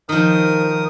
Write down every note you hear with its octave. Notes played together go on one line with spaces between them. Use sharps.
D#3 F3 A#4 D#6